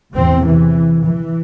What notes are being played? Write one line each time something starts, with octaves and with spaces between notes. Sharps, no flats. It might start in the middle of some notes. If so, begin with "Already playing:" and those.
E2 C3 C4
E3
E3